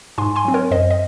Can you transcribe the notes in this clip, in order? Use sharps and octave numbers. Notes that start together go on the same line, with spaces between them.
G#2 G#5 C6
G#5 C6
F#3 C4
A#4 C#5
F#2 C5 D#5
D#5